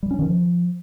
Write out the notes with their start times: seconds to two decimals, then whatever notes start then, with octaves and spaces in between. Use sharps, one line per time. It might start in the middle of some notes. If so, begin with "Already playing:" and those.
0.03 G3
0.11 C#4
0.19 D#3
0.27 F3